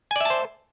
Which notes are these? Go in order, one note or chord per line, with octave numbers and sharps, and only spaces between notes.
C5 D5 E5 G#5 A5